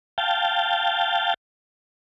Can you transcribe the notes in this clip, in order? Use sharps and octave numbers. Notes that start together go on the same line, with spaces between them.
F5 G5 A5